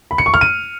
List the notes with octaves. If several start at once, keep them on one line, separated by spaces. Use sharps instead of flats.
B5
C#7
C#6
F6
D#7